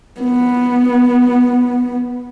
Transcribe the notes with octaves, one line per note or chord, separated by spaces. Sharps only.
B3